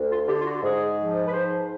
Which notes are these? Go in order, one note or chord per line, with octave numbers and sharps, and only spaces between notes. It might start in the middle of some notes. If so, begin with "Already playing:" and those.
Already playing: D2
F4
D3 G4
F4
F#4
G#2 G#4
F3
B4
G#2 C5